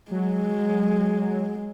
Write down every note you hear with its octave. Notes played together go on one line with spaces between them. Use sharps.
F#3 G#3